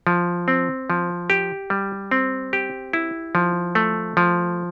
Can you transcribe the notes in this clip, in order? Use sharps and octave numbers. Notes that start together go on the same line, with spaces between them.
F3
C4
F3
G4
G3
C4
G4
E4
F3
A3
F3